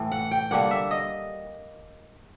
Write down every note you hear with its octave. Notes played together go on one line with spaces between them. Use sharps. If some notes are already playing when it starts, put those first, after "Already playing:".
Already playing: A2 E3 A3
F#5
G5
D3 G3 A#3 D4 F#5
E5
D#5